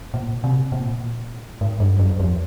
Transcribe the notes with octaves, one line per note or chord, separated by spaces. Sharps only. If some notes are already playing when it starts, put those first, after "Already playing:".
A#2
C3
A#2
G#2
G2
F#2
F2